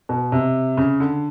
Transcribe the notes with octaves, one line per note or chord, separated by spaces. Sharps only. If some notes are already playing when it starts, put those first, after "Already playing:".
B2
C3
C#3
D3